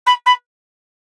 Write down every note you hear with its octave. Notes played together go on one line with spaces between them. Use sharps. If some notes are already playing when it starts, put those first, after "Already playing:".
B5
B5